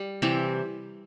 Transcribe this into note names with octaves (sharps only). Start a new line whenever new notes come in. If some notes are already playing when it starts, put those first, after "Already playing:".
Already playing: G3
C3 E3 C4 G4